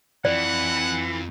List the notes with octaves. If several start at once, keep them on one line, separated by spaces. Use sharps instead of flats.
F2 E3 D5 F#5